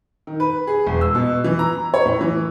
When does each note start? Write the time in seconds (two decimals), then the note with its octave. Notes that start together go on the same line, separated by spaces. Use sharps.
0.27 D#3
0.40 B4
0.67 G#4
0.86 E1
1.01 E6
1.15 B2
1.44 E3
1.59 A#5
1.94 C#5
2.05 A2
2.21 E3